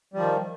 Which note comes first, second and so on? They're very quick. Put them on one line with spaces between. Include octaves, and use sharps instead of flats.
G3 F3 D#3